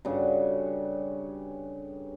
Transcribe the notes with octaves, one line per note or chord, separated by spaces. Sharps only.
G2 C#3 F#4 A4